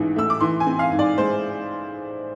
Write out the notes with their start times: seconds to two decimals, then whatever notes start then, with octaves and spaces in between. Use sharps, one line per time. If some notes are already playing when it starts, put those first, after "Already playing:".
Already playing: A1 G#2 E3
0.16 A3 E6
0.30 D6
0.40 E3 C6
0.60 G#5
0.67 C4
0.79 F5
0.92 G#2
0.99 D5
1.18 G#3 C5